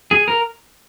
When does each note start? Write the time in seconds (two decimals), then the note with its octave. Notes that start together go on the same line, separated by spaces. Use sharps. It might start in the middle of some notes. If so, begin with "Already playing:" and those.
0.11 G#4
0.28 A#4